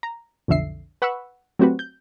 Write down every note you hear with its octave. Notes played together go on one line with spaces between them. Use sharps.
A#5
B1 F2 D3 E5 C7
B4 F#5 B5 C#6 E6
F#3 A3 C4 F#4 G4 B4
G6